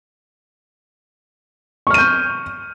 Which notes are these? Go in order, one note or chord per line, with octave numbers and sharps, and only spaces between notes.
C#6 F6 G6 D#7